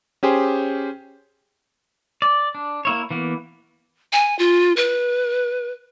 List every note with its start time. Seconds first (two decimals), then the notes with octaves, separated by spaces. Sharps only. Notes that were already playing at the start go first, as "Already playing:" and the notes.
0.23 C#4 G4 G#4 C5
2.22 D5
2.55 D4
2.85 A#3 E4 C#5
3.11 E3 A#3 B3
4.13 G#5
4.39 F4
4.77 B4